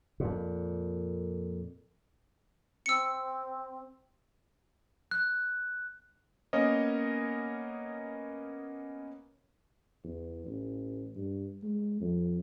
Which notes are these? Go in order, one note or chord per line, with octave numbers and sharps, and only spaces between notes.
F2 A#2
C4 E6 C#7
F#6
A#3 B3 C#4 A#4 C#5 D#5
E2
A1
G2
G#3
F2